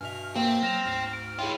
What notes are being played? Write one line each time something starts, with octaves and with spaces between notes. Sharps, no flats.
G2 B2 E5 G#5 F6 F7
A#3 C4
F#3 F6 A#6 E7 F7
D2 G#2
D7
E3 F4 G#4 C#5 G5